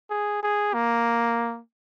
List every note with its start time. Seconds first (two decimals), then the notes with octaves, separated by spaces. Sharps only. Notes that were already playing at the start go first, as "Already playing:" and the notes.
0.10 G#4
0.43 G#4
0.74 A#3